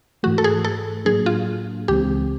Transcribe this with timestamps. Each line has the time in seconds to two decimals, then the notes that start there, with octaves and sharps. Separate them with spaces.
0.23 G#2 E3 A3 F#4
0.38 A4
0.44 G#4
0.64 A4
1.05 A2 F#3 A#3 D4 G#4
1.26 F4
1.88 C#2 C#3 E3 G#3 C4 G4